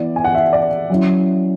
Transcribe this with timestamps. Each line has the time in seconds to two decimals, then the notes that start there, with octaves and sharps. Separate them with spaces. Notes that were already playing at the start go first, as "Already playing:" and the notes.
Already playing: E3 B3 E4 D5
0.16 G#5
0.24 F#5
0.35 E5
0.53 D5
0.90 F#3 C#4 E4